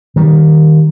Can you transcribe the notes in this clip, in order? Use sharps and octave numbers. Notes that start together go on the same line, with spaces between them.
D#3 G3